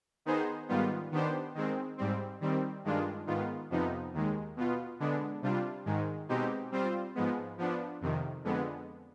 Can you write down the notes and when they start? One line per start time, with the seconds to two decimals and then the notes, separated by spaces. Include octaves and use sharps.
0.25 D#3 B3 D#4 G#4 C5
0.69 G#2 D#3 G3 B3 F4
1.12 D#3 B3 D4 G4 C5
1.55 D#3 G#3 C4
1.98 G#2 G3 C4
2.41 D#3 G3 C4
2.84 G2 D#3 G#3 D4 F4
3.27 G#2 D#3 B3 F4
3.70 F2 C3 F3 B3 D#4
4.14 D#2 D#3 G#3
4.56 B2 B3 F4
5.00 D3 G#3 B3 D4
5.42 C3 G3 D4 F4
5.86 G#2 D#3 G#3
6.29 B2 G#3 C4 D#4 G4
6.72 G3 C4 F4 C5
7.15 G#2 F3 G#3 B3
7.58 F3 B3 D4
8.01 F2 C3 D#3
8.44 F2 D3 G#3 B3